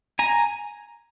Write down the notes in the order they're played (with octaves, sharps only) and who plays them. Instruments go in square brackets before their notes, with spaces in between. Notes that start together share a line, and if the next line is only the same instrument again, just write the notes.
[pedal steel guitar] G#5 A#5